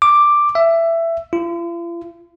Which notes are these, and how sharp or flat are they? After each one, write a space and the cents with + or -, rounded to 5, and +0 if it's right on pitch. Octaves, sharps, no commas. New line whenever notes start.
D6 +5
E5 +15
F4 -45